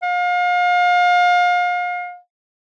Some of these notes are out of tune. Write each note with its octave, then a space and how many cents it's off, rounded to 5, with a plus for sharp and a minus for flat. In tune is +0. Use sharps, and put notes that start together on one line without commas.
F5 +35